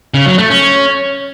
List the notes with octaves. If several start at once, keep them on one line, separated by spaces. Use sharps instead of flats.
C#3
F#3
A3
C#4